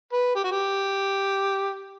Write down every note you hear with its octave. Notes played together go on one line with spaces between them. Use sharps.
B4
G4
F#4
G4